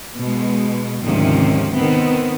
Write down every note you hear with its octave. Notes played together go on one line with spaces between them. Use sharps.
B2 G#3
D2 G#2 C3 D#3 F3 C#4
D#3 B3 C4